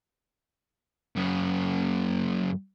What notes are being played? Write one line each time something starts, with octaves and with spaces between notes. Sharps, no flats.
F#2 C#3